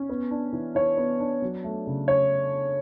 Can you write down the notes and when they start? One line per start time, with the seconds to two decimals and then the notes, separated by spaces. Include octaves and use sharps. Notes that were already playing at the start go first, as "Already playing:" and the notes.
Already playing: C#4
0.09 B3
0.31 D4
0.53 E3
0.75 E3 C#5
0.97 B3
1.20 D4
1.42 F#3
1.64 A3
1.87 C#3
2.08 C#4 C#5